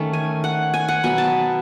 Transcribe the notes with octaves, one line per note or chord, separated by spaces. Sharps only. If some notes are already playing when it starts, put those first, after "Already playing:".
Already playing: D#3 A3 C#4
G#5
F#5
G#5
F#5
B2 F#3 B3 G#5
A5